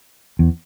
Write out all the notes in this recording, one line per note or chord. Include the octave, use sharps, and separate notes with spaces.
E2